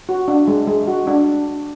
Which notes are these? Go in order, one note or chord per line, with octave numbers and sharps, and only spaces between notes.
F#4
D4
G#3
G#3
F#4
D4